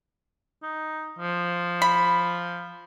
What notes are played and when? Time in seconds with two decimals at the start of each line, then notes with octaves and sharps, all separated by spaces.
0.63 D#4
1.19 F3
1.82 B5